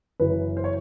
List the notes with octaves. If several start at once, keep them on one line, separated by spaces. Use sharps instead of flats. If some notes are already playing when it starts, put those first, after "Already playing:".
F#1 F#2 C#3 E3 B4
C5
C#5